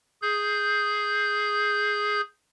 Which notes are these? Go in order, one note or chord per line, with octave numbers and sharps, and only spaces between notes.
G#4 G6